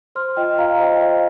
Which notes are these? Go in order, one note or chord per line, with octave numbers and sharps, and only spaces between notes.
C5 C6 F6
F4 D#5 G5
F4 F5 A#5
C5 D#5 G5
C5 F5